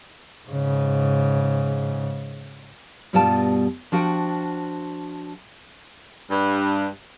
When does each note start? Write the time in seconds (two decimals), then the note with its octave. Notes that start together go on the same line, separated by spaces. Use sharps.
0.47 G#2 C#3
3.13 G2 B2 G3 F4 D5 A5
3.92 F3 D4 F#4 G5
6.30 G2